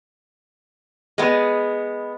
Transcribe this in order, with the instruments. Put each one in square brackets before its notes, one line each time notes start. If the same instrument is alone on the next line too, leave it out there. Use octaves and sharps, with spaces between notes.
[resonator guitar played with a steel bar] G#3 B3